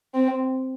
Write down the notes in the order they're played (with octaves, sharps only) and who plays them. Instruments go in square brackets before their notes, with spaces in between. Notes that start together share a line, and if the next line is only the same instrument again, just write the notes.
[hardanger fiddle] C4